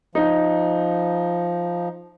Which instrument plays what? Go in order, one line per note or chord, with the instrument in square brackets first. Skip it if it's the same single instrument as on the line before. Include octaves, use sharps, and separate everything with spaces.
[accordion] F3 [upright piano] D#4